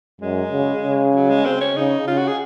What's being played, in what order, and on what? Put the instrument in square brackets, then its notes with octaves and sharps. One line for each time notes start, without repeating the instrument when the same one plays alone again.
[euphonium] F#2 [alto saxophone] G#3
[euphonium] C#3
C#3
[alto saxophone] F#3
G#3
C4
C#4
[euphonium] C#3 [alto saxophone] D#4
[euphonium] C#3 [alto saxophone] F4
[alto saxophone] F#4
G#4